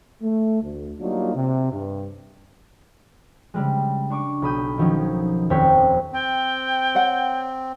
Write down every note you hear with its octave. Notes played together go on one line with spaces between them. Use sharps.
A3
D2
F#3 G3 A#3 D4 D#4 F4
C3
G2
C#3 G3 G#3
D4 C#6 D6
B1 B5 D#6 G6
D#3 F3 F#3 C#4 D#4
D#1 F2 C4 C#5 G5 B6
C4 G5
C#5 F#5